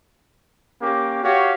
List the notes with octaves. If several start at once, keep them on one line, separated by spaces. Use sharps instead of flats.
A#3 C#4 G4 D6
F#4 G4 C#5 F5